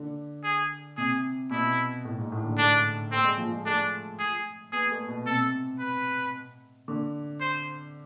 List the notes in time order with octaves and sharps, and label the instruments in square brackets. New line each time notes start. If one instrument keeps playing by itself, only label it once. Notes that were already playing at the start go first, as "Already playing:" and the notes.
Already playing: [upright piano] D3
[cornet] G#4
[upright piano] C3 [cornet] G#4
[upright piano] B2 [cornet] E4
[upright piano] A2
G#2
A2
D3
[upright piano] A3 [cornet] D4
[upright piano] A3 [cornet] C4
[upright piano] G#3
F3
G#3
[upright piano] A3 [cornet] D4
[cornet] G#4
[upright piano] B3 [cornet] G#4
[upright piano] A3
B2
[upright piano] C3 [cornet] A4
[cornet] B4
[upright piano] D3
[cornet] C5